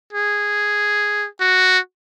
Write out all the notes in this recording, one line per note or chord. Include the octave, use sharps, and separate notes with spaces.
G#4
F#4